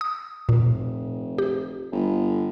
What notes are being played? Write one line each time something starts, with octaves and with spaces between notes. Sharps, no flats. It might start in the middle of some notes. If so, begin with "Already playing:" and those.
D#6
F1 A#2
G4
G1